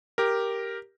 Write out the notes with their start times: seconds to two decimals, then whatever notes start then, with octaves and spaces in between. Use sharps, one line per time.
0.18 G4 A#4